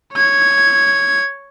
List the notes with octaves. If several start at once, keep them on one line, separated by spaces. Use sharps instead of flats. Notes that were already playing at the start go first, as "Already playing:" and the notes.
C#5 G#6